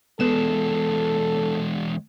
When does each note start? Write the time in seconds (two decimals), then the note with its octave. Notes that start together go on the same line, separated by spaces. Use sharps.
0.20 E2 G#3 B3 A4 E7